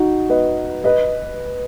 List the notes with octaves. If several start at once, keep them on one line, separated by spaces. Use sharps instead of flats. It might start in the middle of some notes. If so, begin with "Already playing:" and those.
Already playing: D#4 F#4
B4 D#5
B4 D#5